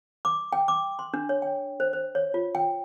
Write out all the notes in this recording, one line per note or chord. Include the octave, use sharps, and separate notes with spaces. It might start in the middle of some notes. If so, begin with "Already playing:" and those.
D6
G5
D6
C6
D4
C#5
G5
C5
C5
C#5
F4
G5